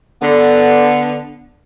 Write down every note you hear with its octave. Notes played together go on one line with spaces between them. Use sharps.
D3 B3